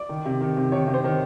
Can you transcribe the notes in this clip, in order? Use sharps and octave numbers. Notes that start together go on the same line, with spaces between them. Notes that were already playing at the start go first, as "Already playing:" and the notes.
Already playing: D5
D#3
C3
D#3
C3
D#3 C#5
C3
C5
D#3